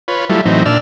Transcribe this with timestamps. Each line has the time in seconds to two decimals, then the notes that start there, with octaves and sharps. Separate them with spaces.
0.08 F4 B4 C#5
0.29 F#3 G3 A3 E4 F4
0.46 A2 E3 F#3 C4 D#4
0.66 A#2 D4 E6 F6